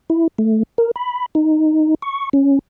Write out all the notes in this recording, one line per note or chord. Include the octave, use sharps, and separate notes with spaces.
E4
A3
A#4
B5
D#4
C#6
C#4